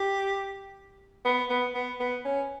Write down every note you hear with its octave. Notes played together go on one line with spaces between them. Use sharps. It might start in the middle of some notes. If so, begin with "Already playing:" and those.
Already playing: G4
B3
B3
B3
B3
C#4